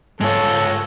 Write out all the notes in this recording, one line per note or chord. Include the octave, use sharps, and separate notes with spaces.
G#2 G#3 F4 A4 C#5